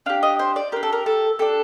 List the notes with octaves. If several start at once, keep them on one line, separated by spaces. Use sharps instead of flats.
D4 G4 F5
D#5
C5
D5
D4 G4 A#4
A4
A#4
A4
D4 G4 A4